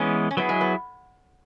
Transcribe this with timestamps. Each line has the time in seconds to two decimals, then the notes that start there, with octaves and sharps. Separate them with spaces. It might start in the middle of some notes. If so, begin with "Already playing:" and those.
Already playing: E3 G#3 B3 C#4
0.31 C#4
0.37 F#3 B3 E4 G#4
0.49 G#3
0.61 B3